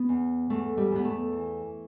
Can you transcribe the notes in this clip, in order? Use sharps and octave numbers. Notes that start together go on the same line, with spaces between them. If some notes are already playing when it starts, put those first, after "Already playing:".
Already playing: B3
E2
E2 A3
G3
E2 B3
A3
E3